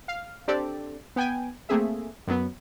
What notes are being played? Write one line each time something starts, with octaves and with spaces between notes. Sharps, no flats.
F5
C4 D4 G4 A4 D5
B3 G5 G#5
A3 A#3 C4 G#4 E5
F#2 F#3 B3